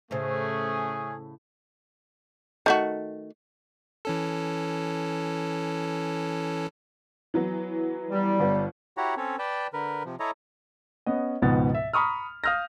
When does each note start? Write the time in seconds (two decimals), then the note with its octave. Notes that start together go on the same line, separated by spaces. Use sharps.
0.11 A2 C#3 A3 C#4 G#4 C5
2.66 D#3 A3 F#4
4.05 E3 C#4 A4
7.34 E3 F#3 B3
8.11 G3
8.40 G1 B3
8.97 E4 F#4 G4 C#5 F#5 A#5
9.17 C4 C#4 A4 C#5
9.39 B4 D5 G5 A5
9.73 D3 A#4 B4
10.05 C3 F3
10.20 E4 A4 C#5 D#5 A#5
11.06 B3 C#4 D#5
11.42 C#2 G#2 B2 F3 B3 A6
11.75 E5
11.93 A#5 B5 C#6 D#6 F6
12.44 F5 D#6 F6 G6 A#6